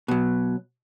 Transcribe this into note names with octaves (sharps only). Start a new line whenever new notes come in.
B2 F#3